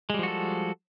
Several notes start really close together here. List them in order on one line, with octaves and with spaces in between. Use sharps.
G#3 G3 F3 F#4 A4